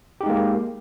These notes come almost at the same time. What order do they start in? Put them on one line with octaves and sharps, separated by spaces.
G4 D#4 G#3 A#3